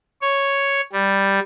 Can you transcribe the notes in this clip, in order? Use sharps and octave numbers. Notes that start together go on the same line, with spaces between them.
C#5
G3